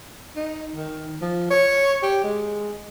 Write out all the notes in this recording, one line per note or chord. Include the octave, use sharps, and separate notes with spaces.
D#4
D#3
F3
C#5
G4
G#3